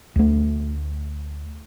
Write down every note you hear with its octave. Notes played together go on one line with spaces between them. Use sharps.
D2 A3